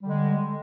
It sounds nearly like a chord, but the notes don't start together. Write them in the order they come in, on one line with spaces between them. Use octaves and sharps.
G3 D3 G#3